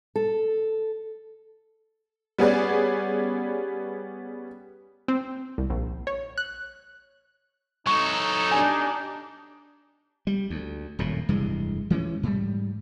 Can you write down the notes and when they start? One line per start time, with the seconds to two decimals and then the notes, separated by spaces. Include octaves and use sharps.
0.16 A4
2.38 G3 B3 C#4 G#4 B4 D5
5.08 C4
5.58 C2
5.70 A#1
6.07 C#5
6.38 F#6
7.87 F#3 D#4 A4 C#6
8.52 D4 G4 G#5
10.27 G3
10.50 D2
10.99 D#1 F#2 A2
11.29 F1 G2 E3 G#3
11.90 E3 G#3 C4 C#4
12.23 G#2 G3